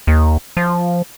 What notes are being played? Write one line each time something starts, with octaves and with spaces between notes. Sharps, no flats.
D#2
F3